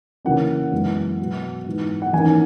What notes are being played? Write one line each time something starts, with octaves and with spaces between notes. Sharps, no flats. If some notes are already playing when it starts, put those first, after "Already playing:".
C#3 E3 A#3 C#4 F#5
F#2 E3 G#3 B3
B2 F#3 B3
G#2 E3 B3
F#5
E2 D#3 A#3 C#4 G#5